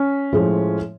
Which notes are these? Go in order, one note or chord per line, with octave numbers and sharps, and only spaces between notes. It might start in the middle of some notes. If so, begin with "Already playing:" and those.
Already playing: C#4
A2 F3 G#3